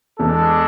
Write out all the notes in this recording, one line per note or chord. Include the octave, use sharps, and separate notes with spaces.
E2 E3 G#3 D4 A4